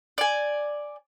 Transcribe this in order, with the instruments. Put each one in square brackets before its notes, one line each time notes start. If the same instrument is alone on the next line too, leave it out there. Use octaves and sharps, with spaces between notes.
[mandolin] D5 G#5